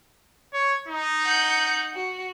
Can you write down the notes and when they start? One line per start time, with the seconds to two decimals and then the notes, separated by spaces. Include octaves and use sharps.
0.54 C#5
0.88 D#4
1.23 F#5 G6
1.94 F#4